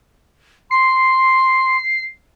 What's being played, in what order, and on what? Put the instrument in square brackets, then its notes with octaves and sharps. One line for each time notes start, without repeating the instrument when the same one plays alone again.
[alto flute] C6 [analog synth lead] C7